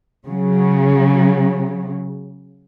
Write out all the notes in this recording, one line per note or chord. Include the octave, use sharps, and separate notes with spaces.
C#3 F#3